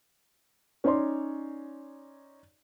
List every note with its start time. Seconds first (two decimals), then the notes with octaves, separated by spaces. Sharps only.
0.84 C#4 D#4 C#5 D5 C6